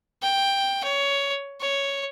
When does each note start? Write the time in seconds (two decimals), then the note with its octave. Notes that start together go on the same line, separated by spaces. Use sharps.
0.22 G5
0.84 C#5
1.61 C#5